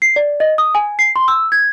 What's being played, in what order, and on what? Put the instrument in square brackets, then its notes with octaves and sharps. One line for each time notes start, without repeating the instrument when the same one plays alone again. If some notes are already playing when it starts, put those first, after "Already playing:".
[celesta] C7
D5
D#5
D#6
G#5
C7
C6
E6
G#6